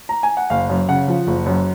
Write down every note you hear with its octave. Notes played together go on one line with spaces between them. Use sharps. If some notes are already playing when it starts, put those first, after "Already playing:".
A#5
G#5
F#5
F#1 F5
F#2
C#3 F#5
F3
F#1
F#2